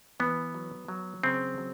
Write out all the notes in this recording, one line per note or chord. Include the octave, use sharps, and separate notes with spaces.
E3 B3
F#3
F#3
C#3 C4
F#3